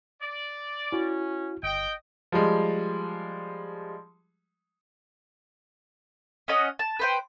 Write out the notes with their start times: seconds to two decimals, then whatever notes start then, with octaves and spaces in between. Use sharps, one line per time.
0.22 D5
0.92 C#4 E4 F#4
1.63 G1 D#5 G5
2.32 F3 G3 G#3
6.48 C#4 D#5 F#5
6.79 A5
6.99 B4 C5 G5